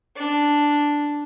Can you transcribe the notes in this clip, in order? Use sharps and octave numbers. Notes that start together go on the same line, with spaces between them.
D4